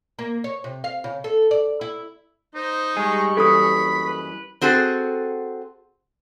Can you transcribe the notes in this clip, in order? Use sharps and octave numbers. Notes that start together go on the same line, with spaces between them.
A#3
C#5
C3
F5
C#3
A4
D5
E4
D#4 C5
G3 G#3 G#4 C#6
F#2 E3 A4 B5 D#6
B4
C4 F#4 G#4 A4